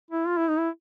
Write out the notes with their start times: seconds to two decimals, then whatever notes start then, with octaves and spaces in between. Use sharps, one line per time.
0.11 E4
0.27 F4
0.37 E4
0.48 D#4
0.58 E4